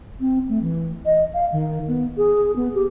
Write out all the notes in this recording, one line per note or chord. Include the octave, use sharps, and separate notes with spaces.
C4
A3
E3
D#5
F5
D#3
B3
G#4
B3
G4